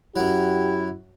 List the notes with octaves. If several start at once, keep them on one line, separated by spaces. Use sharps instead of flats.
F#2 F#3 E4 G4